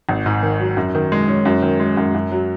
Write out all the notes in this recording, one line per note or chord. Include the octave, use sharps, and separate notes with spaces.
G#1
G#2
D#3
F#3
F#2
D#3
G#3
C#4
F#2
D#3
G#3
F#2
F#2
F#3